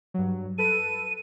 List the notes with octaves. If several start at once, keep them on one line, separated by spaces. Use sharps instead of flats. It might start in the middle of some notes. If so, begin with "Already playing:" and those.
G2 F#3
A4 B4 D#7